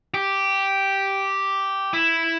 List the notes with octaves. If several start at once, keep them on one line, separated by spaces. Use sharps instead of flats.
G4
E4